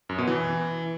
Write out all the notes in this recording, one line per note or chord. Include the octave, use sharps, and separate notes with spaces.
F#2
B2
E3